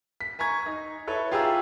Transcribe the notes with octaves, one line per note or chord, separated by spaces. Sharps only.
B6
G#5 A#5 C#6 G#6
D#4
E4 A4 B4 C#5
F4 G4 G#4 E5 A#5 E6